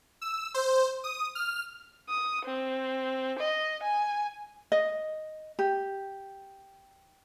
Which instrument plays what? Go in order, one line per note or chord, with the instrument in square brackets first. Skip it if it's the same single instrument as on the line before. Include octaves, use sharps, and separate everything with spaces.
[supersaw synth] E6
C5
D#6
F6
[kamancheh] D#6
C4
D#5
G#5
[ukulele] D#5
G4